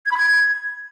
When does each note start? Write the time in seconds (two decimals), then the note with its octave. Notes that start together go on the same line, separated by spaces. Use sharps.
0.05 G#6
0.11 B5
0.17 G#6